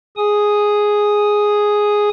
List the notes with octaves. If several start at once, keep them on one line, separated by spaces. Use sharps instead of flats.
G#4 G#5 D#6